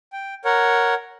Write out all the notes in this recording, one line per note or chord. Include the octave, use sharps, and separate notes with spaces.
G5
A#4 C#5 F#5